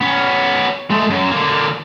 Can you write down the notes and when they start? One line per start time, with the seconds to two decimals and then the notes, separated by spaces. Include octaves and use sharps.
0.01 B3 C#4
0.90 G#3 A3
1.10 F#2
1.31 D3 A#3